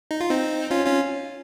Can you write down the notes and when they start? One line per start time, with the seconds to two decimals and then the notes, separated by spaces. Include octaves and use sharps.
0.11 D#4
0.20 F4
0.30 C4 D#4
0.71 C#4 F4
0.85 C#4 F4